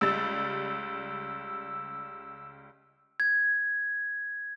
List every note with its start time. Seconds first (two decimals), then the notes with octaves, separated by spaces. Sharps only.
0.01 C#2 G3 E6 A6
3.20 G#6